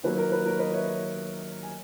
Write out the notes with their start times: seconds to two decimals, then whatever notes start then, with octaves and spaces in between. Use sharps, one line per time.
0.03 D#2 D#3 F#3 A#3 B4
0.18 A#4
0.32 B4
0.45 A#4 C#5
0.59 B4 D#5
0.74 C#5 E5
1.63 G#5